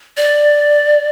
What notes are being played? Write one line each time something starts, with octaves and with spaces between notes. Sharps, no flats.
D5